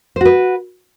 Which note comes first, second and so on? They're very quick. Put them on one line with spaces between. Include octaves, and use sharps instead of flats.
C5 F#4 B4